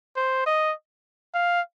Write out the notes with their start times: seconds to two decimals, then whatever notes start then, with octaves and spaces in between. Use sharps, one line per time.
0.16 C5
0.46 D#5
1.34 F5